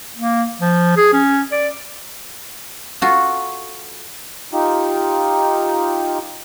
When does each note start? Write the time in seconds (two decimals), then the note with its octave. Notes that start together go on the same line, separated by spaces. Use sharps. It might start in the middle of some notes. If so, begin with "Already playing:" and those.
0.16 A#3
0.60 F3
0.97 G#4
1.13 C#4
1.52 D5
3.02 F4 F#4 A4
4.53 D#4 F4 G4